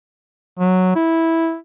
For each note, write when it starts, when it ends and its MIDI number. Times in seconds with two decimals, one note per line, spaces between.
0.59 0.95 54
0.96 1.56 64